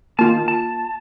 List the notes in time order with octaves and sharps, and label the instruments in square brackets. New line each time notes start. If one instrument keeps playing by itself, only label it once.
[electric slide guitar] D#3 A5 [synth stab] A#3 F4
[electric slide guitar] A5